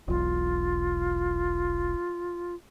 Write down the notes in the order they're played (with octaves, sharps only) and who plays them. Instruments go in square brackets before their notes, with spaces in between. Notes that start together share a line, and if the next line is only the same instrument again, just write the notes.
[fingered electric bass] E1 B1 [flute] F4